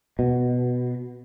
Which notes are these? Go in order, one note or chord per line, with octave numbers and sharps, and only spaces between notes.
B2